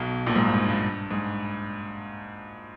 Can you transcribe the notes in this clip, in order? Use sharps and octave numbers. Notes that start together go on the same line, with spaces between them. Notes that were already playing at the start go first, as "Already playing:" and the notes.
Already playing: B1 B2
A#1 A#2
G#2
G2
G#2
G2
G#2